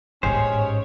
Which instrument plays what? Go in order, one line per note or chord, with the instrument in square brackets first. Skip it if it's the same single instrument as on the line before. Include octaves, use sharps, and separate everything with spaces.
[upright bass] A1 G#2 [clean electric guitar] G#3 G4 C5 [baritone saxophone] C#4 [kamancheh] C#5